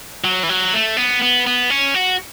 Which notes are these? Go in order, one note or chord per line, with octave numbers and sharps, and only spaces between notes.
F#3
E3
F#3
A3
B3
B3
B3
C#4
F#4